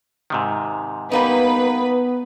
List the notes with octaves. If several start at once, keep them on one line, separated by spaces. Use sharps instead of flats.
G#2 C3 D#3
G3 A#3 B3 D#4 B4